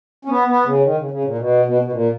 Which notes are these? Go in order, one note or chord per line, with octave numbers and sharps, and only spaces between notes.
C#4
B3
B3
C#3
D#3
C#3
C#3
A#2
B2
B2
B2
A#2